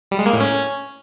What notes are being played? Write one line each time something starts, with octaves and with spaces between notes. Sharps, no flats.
G3
G#3
A#3
A2
C#4